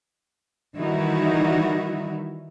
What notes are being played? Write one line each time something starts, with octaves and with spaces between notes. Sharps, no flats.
D#3 E3 G3 D#4 E4 F#4